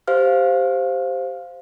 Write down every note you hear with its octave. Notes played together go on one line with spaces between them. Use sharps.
G4 C5 F5 F6